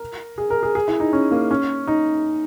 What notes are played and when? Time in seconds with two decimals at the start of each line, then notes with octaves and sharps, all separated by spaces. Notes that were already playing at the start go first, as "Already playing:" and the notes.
Already playing: A#4
0.38 G#4
0.50 A#4
0.63 G#4
0.75 G#4
0.88 E4
1.00 D#4
1.13 C#4
1.31 A#3
1.51 C#4
1.87 D#4